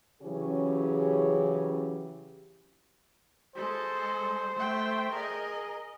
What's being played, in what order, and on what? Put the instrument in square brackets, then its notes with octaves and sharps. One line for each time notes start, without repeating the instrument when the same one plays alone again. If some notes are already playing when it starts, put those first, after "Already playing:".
[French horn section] C#3 E3 F#3 C#4 G4 G#4
[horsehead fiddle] G#3 A4 [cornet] C5
[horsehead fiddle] A3 G5
[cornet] G#4 [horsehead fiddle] A#4 D#5